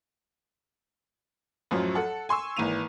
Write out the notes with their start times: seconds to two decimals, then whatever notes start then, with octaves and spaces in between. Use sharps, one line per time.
1.71 A1 F#2 F3 F#3
1.95 A4 F#5
2.29 G#5 C6 C#6 E6
2.57 G#1 E3 A#3 D#7 F7